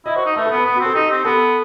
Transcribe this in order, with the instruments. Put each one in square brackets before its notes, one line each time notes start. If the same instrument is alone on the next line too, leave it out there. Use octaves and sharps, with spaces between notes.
[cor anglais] E4 [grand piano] D#5
[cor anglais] F#4 [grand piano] C5
[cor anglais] D#4
[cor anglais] A3 [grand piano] B4
[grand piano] A4
[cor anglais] B3 [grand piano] B4
[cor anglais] B3 [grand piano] B4
[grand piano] F#4
[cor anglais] C4 [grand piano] A4
[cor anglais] D#4 [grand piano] G4
[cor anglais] C4
[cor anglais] B3 [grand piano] A4